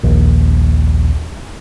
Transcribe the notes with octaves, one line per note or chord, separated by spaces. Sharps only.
A#1 D#2